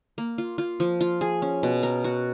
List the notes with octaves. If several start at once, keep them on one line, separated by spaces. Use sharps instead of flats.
A#3
F4
F4
F3
F4
G#4
C#4
B2
A#4
F#4